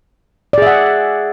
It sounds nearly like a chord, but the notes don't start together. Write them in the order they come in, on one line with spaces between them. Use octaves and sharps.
D5 G#4 E5 F#5